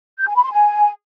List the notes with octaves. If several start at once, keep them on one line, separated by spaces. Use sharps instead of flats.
G6
G#5
B5
C6
G#5